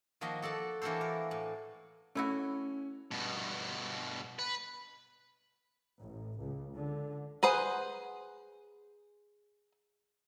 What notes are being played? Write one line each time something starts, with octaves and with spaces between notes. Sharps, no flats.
D#3 F3 A#3 F#4 D#5 C6
F#4 A4 D5 A5
E3 A#3 D4 F#4 A4 C5
A#4
A2
A3 C#4 E4 F#4
G2 B2
B4
A1
C#2
D3
G#4 B4 C5 F#5